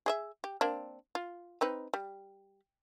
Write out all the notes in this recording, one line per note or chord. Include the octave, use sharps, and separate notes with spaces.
G#4 D#5 E5
G4
A#3 C4 D4
F4
C4 D#4 B4
G3